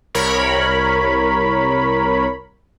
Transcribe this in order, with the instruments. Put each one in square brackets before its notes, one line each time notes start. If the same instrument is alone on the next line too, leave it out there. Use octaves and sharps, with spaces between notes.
[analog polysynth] C2 A#4 C#5 B5